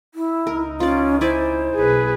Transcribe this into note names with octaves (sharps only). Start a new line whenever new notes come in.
E4
C#2 D#4 A#4
C#4 F4 D5
E4 C5 D5 G#5
B1 G#4 B4